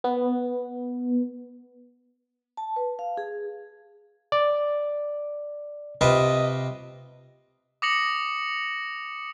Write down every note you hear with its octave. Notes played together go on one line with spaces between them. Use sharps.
B3
A5
B4
F5
G#4
D5
C3 F4 B4 D#5
D6 D#6 A#6 C#7 F#7